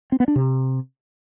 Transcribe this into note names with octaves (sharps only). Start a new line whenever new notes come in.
C4
B3
D4
C3